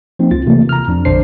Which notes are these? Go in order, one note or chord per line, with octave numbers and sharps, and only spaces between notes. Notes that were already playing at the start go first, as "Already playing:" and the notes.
F3 A#3 C4 D#4
C#2 F4 A6
C3 E3 A3 A#3
A#5 F6
F2 D4
A#1 D3 D4 C5 C7